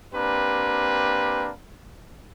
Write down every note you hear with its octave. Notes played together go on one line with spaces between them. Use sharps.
A#3 C4 D4 G4 B4